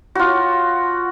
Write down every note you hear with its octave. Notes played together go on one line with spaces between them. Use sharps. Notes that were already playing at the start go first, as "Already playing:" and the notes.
F4 F#4